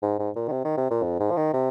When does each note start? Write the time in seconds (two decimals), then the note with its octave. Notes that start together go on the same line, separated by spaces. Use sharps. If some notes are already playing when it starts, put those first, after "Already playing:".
0.02 G#2
0.19 G#2
0.36 A#2
0.48 D#3
0.52 C3
0.65 D#3
0.77 C3
0.91 A#2
1.03 F2
1.20 G#2
1.31 F3
1.37 D#3
1.53 C3